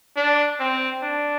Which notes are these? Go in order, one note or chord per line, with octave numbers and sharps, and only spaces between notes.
D4
C4
D4